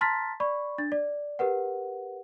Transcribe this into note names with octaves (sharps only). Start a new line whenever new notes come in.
A5 A#5 C6 F6 A6 B6
D5 B5 C#6
D4 A6
D5
G4 A#4 B4 F#5